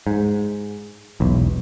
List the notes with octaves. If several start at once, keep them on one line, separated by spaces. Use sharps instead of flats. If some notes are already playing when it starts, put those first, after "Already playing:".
G#2
E1 B1